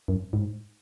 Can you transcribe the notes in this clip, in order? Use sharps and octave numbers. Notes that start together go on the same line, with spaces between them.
F#2
G#2